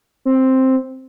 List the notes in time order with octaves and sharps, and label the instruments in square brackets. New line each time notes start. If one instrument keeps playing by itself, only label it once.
[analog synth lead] C4